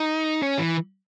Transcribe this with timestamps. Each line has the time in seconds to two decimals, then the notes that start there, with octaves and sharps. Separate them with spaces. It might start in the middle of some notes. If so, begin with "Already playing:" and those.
Already playing: D#4
0.43 C#4
0.59 E3